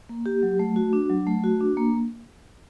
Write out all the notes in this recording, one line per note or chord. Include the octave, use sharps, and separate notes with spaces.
A#3
G4
F#3
A3
F#4
D4
F#3
A3
F#4
D4
A#3